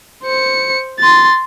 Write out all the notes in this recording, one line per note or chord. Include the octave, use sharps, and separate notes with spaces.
C5 C#7
C6 A6